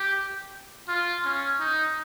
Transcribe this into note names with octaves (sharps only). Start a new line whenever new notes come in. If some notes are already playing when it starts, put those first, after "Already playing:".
Already playing: G4
F4
C#4
D#4